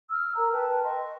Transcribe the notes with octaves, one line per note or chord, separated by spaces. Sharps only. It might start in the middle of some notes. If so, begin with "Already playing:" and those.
E6 F6
A#4 A#5
B4 G5 A5
D#5 G5 C6 C#6